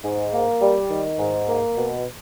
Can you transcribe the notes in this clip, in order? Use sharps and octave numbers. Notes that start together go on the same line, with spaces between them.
G#2
A#3
G3
D#3
G#2
A#3
B2